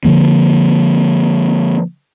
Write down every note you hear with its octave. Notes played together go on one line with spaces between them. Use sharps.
D3 D#3 F3 A#3